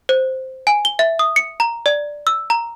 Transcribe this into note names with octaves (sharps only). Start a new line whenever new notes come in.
C5
G#5
G7
E5
D#6
C#7
A#5
D5
E6
A#5